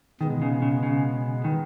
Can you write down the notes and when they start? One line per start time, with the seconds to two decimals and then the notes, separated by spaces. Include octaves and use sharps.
0.20 B2 D#3 G#3 B3
0.42 C#3
0.62 C#3
0.83 C#3
1.44 D#3